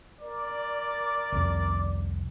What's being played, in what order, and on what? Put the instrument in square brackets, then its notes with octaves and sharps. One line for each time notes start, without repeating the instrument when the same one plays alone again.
[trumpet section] A#4 D5
[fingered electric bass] C2 F2